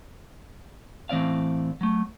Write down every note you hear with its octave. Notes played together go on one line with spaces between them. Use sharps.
A2 E3 C4 D5 F5
F#3 A3